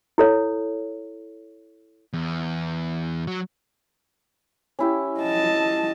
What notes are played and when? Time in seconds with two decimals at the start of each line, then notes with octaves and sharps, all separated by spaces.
0.18 E4 A4 C#5
2.13 E2
3.27 F#3
4.79 C#4 E4 G4
5.20 D#5 A5